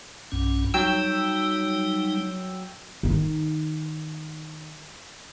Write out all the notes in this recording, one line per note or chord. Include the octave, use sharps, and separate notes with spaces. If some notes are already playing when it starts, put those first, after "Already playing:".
B1 G2 C#4
F#3 G3 D#4 G5 E6
D#3 D#4